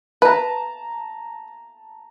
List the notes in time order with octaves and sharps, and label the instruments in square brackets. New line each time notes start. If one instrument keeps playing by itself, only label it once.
[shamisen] B4 [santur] A5 A#5